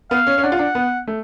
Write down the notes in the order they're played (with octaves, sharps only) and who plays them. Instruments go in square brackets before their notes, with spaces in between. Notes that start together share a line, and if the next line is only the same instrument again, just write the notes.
[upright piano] B3 [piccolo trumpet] F5
[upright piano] C#4
C#4
[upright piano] D4 [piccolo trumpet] F#5
[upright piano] F4
D4
B3
A3